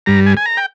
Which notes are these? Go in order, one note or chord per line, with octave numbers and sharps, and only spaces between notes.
G2 G3 A#5
G#5
G#5
A#5
G5